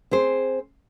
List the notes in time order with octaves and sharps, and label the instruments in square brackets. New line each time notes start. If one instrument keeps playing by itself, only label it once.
[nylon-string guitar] C4 G#4 C5